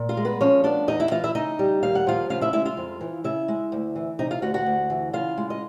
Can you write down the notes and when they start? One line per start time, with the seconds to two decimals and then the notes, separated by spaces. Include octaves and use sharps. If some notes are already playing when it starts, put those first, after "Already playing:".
Already playing: A#2
0.09 F4 F5
0.17 G#3
0.25 B3 B4
0.41 F3 C#4 C#5
0.64 B3 D4 D5
0.88 E2 D#4 D#5
1.00 E4 E5
1.11 E3 F4 F5
1.24 E4 E5
1.35 C#3 D#4 D#5
1.59 G3
1.83 D#2 F5
1.95 F#5
2.07 F3 F4 F5
2.30 C#3 F4 F5
2.41 E4 E5
2.53 G#3 E4 E5
2.65 F4 F5
2.77 F2
3.01 E3
3.24 C#3 E4 E5
3.48 G#3
3.72 D2
3.96 E3
4.19 C3 D#4 D#5
4.31 F4 F5
4.42 D2 F#4 F#5
4.54 F#4 F#5
4.66 D2
4.90 E3
5.13 C#3 F4 F5
5.37 G#3
5.50 D#5